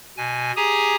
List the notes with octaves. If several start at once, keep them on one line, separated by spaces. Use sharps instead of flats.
B2 G#5
G4 G#4 G#5 A#5 D#6